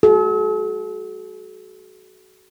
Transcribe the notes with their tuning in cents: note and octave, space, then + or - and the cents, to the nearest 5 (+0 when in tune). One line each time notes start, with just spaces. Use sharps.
F#4 +20 A4 -45